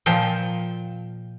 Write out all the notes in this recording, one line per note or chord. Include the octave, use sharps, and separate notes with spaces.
A#2 F3 G5